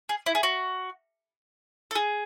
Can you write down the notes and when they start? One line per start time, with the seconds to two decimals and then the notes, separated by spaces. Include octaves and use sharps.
0.09 G#4
0.26 E4
0.35 G#4
0.43 F#4
1.91 A4
1.95 G#4